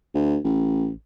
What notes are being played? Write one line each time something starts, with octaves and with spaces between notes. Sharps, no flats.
D2
A1